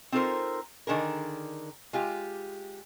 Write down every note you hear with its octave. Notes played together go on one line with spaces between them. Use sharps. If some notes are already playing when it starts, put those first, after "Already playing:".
C4 D#4 F4 A4 A#4 C5
D3 D#3 D4 G#4 A#4
G#3 F4 G4